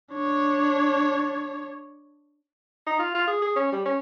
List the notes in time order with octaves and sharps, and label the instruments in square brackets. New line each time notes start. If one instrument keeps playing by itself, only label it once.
[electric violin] D4 C#5
[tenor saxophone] D#4
F4
F4
G#4
G#4
C#4
G3
C#4